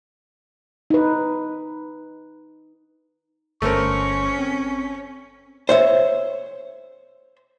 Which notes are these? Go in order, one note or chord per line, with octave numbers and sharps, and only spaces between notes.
D#4 B4
G1 A3 C#4 A#4 C5 C#6
C4
C5 C#5 E5